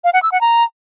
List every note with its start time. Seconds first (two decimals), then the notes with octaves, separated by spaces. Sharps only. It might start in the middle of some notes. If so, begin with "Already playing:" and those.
0.04 F5
0.13 F#5
0.23 E6
0.32 F#5
0.41 A#5